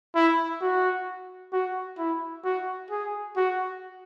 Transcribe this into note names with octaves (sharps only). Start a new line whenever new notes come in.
E4
F#4
F#4
E4
F#4
G#4
F#4